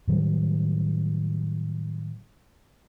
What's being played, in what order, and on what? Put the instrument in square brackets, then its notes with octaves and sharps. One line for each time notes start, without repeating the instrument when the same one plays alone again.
[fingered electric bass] A2 D#3 F#3 G3